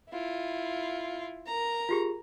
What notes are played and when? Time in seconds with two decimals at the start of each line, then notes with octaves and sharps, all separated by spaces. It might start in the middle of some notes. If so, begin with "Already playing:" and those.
0.10 E4 F4
1.46 A#4 A#5
1.89 F4 G4 G#4